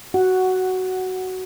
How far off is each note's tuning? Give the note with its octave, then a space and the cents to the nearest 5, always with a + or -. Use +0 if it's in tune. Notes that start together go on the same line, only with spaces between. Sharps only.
F#4 +10 F#5 +0